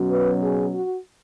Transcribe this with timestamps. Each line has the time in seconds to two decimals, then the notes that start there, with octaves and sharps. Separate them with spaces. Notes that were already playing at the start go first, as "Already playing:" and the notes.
Already playing: B2 F#3 C#4
0.10 B4
0.43 G#4
0.74 F#4